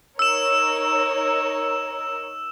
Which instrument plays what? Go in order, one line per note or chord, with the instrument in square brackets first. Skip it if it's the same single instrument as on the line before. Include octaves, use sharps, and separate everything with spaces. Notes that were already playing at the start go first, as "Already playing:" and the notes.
[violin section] D#4 A#4 C#5 [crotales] E6 E7